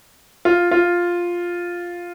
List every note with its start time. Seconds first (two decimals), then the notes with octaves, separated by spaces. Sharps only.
0.45 F4
0.71 F4